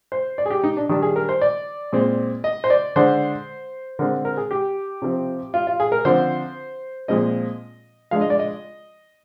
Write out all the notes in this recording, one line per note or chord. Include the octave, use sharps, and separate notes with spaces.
C5
D5
G#4
G4
D#4
D4
D#3 G3 D4 D#4
G#4
A#4
C5
D5
A#2 G#3 C4
D#5
C5
D5
D3 G#3 D4 C5
D3 G#3 C4 A#4
A#4
G#4
G4
C3 F3 C4
F4
F4
G#4
A#4
D3 F3 C4 C5
A#2 F3 G#3 C4 D#5
F3 G#3 D4 F5
D#5
D5
D#5